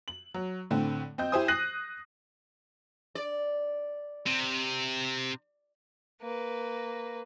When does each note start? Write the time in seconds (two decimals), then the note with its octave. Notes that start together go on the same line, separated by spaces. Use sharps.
0.08 F#7
0.34 F#3
0.71 A2 D3 C4
1.18 C4 D#5 G6
1.32 E4 G4 C5 G#5 D#6
1.48 F#6 A#6 C7 D#7 F#7
3.15 D5
4.26 C3
6.22 A#3 B4